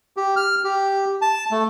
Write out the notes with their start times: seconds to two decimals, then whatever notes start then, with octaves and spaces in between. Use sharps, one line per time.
0.17 G4
0.36 F6
0.64 G4
1.22 A5
1.51 A3